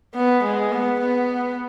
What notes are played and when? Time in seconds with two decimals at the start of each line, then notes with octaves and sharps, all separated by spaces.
0.15 B3
0.43 G#3
0.72 B3
1.00 B3